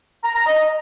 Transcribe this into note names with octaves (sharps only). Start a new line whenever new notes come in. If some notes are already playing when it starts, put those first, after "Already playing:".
A#5
A#5
D#5